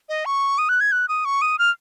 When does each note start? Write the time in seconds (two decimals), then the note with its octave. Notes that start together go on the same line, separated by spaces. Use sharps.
0.09 D#5
0.25 C#6
0.58 D#6
0.69 F#6
0.81 G#6
0.92 F#6
1.09 D#6
1.25 C#6
1.42 D#6
1.59 F6